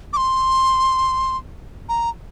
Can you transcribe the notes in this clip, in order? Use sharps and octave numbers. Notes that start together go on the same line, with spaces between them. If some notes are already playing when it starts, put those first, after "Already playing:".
D6
C6
A#5